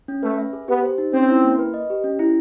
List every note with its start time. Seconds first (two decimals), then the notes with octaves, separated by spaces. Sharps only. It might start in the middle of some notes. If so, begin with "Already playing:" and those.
0.08 C#4
0.23 A3 B4
0.38 E5
0.53 G#4
0.68 B3 G4
0.83 C5
0.98 D#4
1.13 C4 C#4
1.29 E4
1.44 A#3
1.59 B4
1.74 D#5
1.90 G4
2.04 C#4
2.19 E4